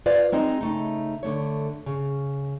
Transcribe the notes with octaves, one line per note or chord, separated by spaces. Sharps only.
F4 B4 C5 D5 F5
G#3 C4 D#4 D#5
C#3 A3 D#4
D3 A3 C#5
C#3